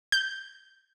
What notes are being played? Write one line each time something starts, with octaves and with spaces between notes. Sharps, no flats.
G6